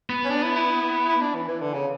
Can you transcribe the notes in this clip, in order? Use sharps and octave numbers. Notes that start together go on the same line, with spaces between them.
B3
C#4
D4
E4
E4
E4
D4
E3
E3
D3
C#3